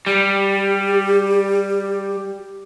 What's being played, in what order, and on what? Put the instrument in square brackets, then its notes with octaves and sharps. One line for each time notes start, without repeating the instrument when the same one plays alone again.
[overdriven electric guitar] G3 [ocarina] G4